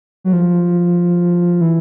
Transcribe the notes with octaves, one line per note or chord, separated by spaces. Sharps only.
F#3
F3
E3